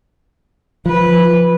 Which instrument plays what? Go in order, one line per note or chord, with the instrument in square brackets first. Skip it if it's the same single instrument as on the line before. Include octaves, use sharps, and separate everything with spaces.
[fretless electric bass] F3 [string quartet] B4